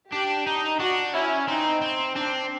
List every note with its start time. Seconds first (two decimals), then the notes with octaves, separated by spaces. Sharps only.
0.12 D4 G4
0.47 D#4
0.79 D4 F#4
1.13 C#4 E4
1.48 C4 D#4
1.81 C4
2.15 C4 D4